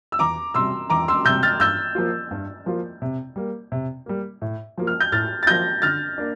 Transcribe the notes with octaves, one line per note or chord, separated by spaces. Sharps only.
E6
E2 A#5 D6
C3 G3 C6 E6
E2 A#5 D6
C6 E6
C3 G3 E6 G6
F6 A6
G2 E6 G6
F3 A#3 F4
G2
F3 A#3 F4
C3
G3 A#3
C3
G3 A#3
A2
F3 A#3 F4
F6
G6
A2 F6 A6
A6
F3 A#3 F4 G6 A#6
D3 F6 A6
A#3 D4